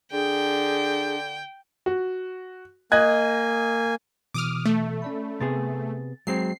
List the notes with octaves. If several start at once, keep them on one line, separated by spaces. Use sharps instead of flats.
D3 D4 G#4 G5
F#4
A#3 D#5 G#5 F#6 G#6
B2 E3 D6 D#6 F6
A3
C#4 D5 B5
C3 B3 G#4 A6
F#3 G#3 C4 C7